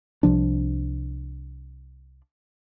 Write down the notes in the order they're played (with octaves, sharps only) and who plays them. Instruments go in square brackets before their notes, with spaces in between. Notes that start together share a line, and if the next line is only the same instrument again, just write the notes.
[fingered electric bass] C2 C3 F3 D4